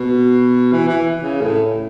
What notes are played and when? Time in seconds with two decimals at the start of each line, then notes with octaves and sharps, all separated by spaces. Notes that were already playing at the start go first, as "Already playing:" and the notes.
Already playing: B2
0.72 E3
0.89 E3
1.23 C#3
1.41 A2